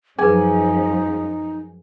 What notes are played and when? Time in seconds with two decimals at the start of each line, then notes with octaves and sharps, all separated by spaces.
0.19 F#2 F3 G#3 D#4 G#4 B4 G#5